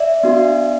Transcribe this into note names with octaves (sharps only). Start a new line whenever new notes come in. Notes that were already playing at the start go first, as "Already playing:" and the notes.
Already playing: D5 E5
B3 D4 F#4